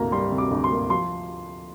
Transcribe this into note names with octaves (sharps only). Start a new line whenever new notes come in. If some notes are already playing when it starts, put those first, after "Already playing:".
Already playing: D2 C3 A#3 A#5
G3 C6
C3
D6
D2
C6
A#3
F3 C6